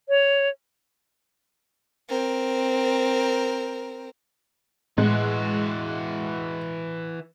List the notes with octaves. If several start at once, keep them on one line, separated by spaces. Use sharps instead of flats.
C#5
C4 A#4
A2 E3 G#3 F#4